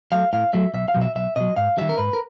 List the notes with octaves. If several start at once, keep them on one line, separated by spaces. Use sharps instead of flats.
F#3 A3 F5
A2 F5
F#3 A3 E5
B1 E5
F5
B2 F#3
E5
B1 E5
B2 F#3 D#5
G#2 F5
D#3 G3 E5
A#4
G#2 B4
A#4